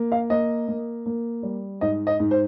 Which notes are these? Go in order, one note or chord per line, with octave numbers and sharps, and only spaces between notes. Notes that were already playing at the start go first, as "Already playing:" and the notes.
Already playing: A#3
F5
A#3 D#5
A#3
A#3
G3
G#2 D#5
D#5
G#2
C5